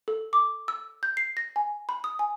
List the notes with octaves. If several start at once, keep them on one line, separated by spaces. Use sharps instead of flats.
A4
D6
E6
G6
C7
A#6
G#5
B5
D#6
G#5